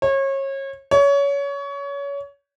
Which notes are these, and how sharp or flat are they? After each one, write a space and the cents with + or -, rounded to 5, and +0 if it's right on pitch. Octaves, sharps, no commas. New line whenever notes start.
C#5 -30
C#5 +25